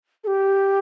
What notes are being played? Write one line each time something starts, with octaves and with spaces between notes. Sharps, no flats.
A4
G4